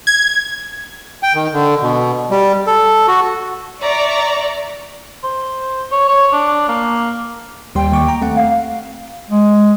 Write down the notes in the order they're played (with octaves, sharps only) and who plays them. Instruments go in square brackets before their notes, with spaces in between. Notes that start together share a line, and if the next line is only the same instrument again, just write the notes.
[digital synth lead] G#6
[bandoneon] G5
D#3
D3
B2
G3
A4
F#4
[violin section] D5 E5 A#5 C#6
[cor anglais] C5
C#5
C#5
D4
A#3
[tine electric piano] D#2 G3 C6 [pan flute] G5
[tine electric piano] D#2 C#6 D6
A#5
A3 C4 F#5
[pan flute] F5
[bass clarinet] G#3